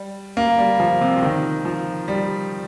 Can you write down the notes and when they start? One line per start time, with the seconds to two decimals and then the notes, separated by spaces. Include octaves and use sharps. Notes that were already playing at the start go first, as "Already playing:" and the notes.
Already playing: G3
0.37 A#3
0.58 G3
0.80 F3
1.01 C3
1.17 C3
1.23 D#3
1.65 F3
2.08 G3